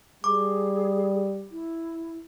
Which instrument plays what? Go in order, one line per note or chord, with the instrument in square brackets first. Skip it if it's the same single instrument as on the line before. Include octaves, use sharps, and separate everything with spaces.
[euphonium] G3 [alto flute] G#4 [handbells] D6
[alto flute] E4